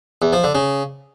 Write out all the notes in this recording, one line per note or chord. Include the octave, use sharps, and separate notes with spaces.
E2
F3
D3
C#3